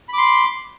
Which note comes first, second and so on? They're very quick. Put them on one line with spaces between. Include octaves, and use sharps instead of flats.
B5 D6 C6